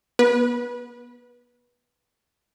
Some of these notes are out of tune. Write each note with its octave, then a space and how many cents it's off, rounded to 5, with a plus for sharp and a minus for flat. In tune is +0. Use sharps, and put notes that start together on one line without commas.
B3 -30 B4 -20